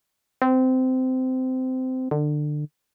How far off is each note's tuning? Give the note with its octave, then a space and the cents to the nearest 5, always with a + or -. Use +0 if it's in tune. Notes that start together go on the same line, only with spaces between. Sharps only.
C4 -20
D3 +25